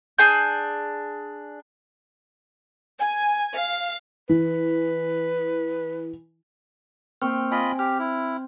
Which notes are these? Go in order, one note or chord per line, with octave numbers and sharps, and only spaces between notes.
D4 G#4 G#5 G6
G#5
F5
E3 B4
A#3 C4 C#6 F6
F4 D#5 G#5 B5
G4 F6
E4